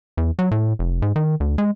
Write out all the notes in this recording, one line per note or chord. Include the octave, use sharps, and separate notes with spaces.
E2
F#3
A2
F1
G#2
D#3
D2
G#3